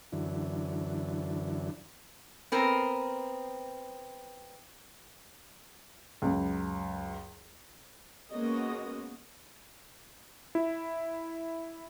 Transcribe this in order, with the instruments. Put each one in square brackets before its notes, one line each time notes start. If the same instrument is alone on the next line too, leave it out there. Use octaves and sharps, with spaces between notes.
[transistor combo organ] F#2 D3 E3
[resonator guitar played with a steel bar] B3 C4 A#4
[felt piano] C#2 F#2
[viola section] G#3 A#3 B3 C#4 F#4 D#5
[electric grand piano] E4